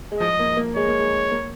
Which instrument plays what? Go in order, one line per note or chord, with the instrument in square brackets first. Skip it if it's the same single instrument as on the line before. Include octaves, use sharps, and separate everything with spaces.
[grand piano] G#3
[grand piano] F3 [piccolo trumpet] D#5
[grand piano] A#3
A#3
[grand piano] G#3 [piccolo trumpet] C#5
[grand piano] A#3
G#3
A#3